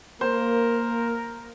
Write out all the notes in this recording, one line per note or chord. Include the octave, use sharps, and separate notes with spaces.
A#3 A#4 C5